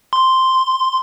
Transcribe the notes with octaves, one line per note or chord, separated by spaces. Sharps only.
C6